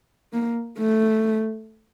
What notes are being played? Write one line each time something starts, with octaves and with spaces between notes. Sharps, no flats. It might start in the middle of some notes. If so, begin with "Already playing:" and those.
A#3
A3